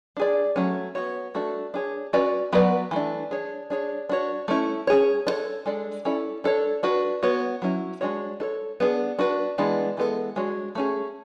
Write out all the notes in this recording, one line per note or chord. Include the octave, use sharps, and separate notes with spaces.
D4 G#4 D5
F#3 A3 C#4
B3 F#4 C#5
A3 D4 F#4 A4
D4 G#4 C#5
C#4 F#4 B4 D5
F#3 B3 F#4 B4 D5
E3 A3 D4
D4 G#4 C#5
D4 G#4 C#5
D4 F#4 C#5
A3 C#4 E4
C#4 G#4 C#5
D4 A4 C#5
G#3 D4 A4 D5
C#4 E4 A4 D5
D4 A4 C#5
D4 F#4 B4
B3 F#4 C#5
F#3 C#4 E4
G#3 D4 F#4 C#5
D4 A4 C#5
B3 D4 G#4
D4 F#4 B4
E3 G#3 B3 D4
E3 G#3 B3 D4 A4
G#3 D4 F#4 C#5
A3 C#4 G#4